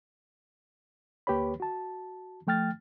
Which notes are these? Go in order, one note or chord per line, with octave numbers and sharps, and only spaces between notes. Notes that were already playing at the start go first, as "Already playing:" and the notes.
D2 A#3 G4 B4 C#5 B5
F#4 A5
F3 A3 G5 F6 A6